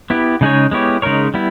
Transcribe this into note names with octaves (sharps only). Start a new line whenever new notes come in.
B3 E4 G4
C#3 G#3 D#4 G#4 C#5
G#3 B3 E4 G4 C#5
C#3 G#3 D#4 A#4 C#5
G3 B3 E4